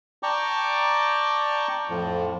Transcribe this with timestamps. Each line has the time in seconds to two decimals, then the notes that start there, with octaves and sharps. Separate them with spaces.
0.23 D5 G5 A5 A#5 C#6 D6
1.90 F2 A2 F3